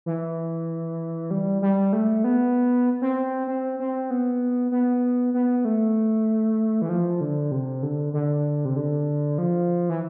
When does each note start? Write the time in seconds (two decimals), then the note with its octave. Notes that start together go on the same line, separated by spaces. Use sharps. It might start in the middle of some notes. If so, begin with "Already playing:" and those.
0.06 E3
1.31 G3
1.62 G3
1.93 A3
2.24 B3
3.02 C4
3.47 C4
3.80 C4
4.10 B3
4.72 B3
5.34 B3
5.65 A3
6.82 E3
6.89 F3
7.21 D3
7.51 C3
7.83 D3
8.13 D3
8.65 C3
8.76 D3
9.38 F3
9.89 E3